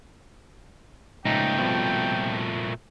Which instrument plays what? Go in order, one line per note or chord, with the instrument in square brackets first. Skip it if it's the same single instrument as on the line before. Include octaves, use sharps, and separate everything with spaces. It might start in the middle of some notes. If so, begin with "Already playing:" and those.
[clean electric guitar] C#2 F3 D#4 [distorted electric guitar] A#2 A3 [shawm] G5
[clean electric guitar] C2 B2 F3